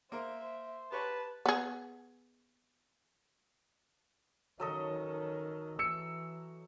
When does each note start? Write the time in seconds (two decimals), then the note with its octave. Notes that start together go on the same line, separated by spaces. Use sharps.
0.12 A#3 A#4 C5 E5
0.43 C5
0.92 G4 B4 C#5 A5 A#5
1.46 B3 G#4
4.60 D#3 F#3 C#4 A4 D#5
5.79 E3 E6 C#7